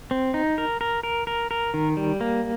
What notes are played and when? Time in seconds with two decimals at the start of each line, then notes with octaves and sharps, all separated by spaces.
0.11 C4
0.34 D#4
0.58 A#4
0.81 A#4
1.03 A#4
1.27 A#4
1.51 A#4
1.74 D#3
1.97 G3
2.21 A#3